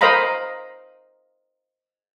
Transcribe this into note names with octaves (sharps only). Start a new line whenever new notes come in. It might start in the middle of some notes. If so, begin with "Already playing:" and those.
A#4 C5 D#5 F5 A#5 B5